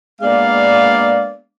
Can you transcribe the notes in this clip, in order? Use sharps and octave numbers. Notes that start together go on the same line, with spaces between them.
G#3 A#3 B3 D4 D5 F5